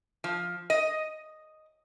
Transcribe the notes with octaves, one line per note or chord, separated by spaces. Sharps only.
F3
D#5